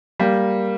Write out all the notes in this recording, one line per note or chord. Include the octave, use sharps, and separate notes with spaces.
G3 A#3